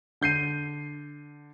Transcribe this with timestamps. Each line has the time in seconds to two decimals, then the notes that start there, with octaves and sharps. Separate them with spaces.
0.21 D3 G6 C7 D#7